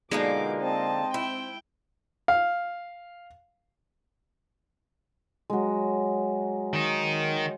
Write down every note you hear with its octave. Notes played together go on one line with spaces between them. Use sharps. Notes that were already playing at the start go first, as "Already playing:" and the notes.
B2 D3 F3 G#3 A#3 D#4 D6
C4 D#5 A5
E4 G5
F5
F#3 G#3
D#3 D#4